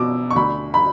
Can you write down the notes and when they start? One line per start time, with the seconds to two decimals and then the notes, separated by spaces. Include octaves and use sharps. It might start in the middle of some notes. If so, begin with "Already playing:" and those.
Already playing: B2 D6 E6
0.31 C#6
0.36 D2 B5
0.74 B5